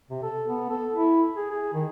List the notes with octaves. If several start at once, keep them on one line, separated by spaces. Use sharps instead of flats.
C3
A4
B3
A4
E4
G#4
G#4
D#3